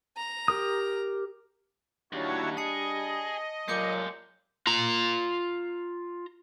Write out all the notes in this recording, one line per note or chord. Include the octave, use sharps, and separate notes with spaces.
A#5
G4 A#4 D#6
D#2 G3 D4 E4 F#4 C#5
G#4 D#5 A5 C#7
A#2 F#3 G#3 G4 D6 G6 C#7
F4 A#5